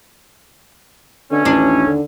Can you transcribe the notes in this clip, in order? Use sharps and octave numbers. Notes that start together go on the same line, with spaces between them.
B2 D3 A3 C#4
A1 D#2 D4
D3